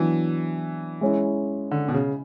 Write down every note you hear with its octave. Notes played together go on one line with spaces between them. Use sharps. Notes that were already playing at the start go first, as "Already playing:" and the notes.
Already playing: E3 F#3 B3 D4
G#3 C#4 E4
D3
B2
C#3